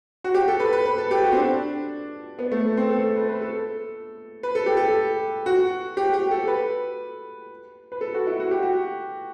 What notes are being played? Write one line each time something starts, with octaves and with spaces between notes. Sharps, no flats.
F#4
G4
A4
B4
B4
B4
A4
G4
F#4
C4
D4
B3
A3
B3
C4
A4
A4
B4
B4
A4
B4
A4
G4
A4
F#4
G4
G4
A4
B4
B4
A4
F#4
E4
F#4
G4
F#4